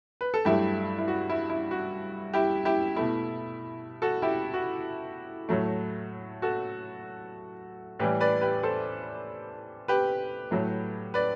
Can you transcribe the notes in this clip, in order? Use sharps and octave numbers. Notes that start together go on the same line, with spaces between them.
B4
A4
G2 F#3 A3 E4 G4
E4
F#4
E4
E4
F#4
E4 G4
E4 G4
B2 A3 E4
F#4 A4
E4 G4
F#4
A2 F#3 A3
F#4 A4
A2 E3 G3 G4 B4
B4 D5
G4 B4
A4 C5
G4 B4
A2 F#3 A3
B4 D5